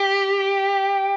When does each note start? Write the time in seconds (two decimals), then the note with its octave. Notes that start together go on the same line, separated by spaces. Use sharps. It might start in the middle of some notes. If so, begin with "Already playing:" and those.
Already playing: G4